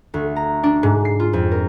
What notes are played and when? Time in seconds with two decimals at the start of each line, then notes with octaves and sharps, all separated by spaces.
0.14 D2
0.36 A#5
0.63 D4
0.83 G#2
1.05 C7
1.20 F4
1.33 F2
1.52 A#4